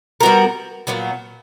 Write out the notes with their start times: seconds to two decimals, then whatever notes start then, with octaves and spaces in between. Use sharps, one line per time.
0.21 G3 B3 F#4 A#4
0.87 A#2 F#3 B3